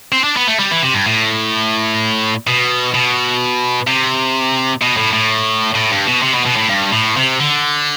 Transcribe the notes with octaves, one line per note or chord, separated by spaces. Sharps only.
C4
D4
B3
A3
G3
E3
C3
G2
A2
B2
B2
C3
B2
A2
A2
A2
G2
B2
C3
B2
B2
A2
G2
A2
C3
D3